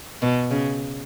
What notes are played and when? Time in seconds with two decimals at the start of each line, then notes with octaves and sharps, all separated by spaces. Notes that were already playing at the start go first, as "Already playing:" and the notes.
0.22 B2
0.51 C#3